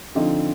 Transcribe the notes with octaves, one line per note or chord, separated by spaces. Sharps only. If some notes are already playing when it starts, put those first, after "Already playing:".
D3 F3 C4 D#4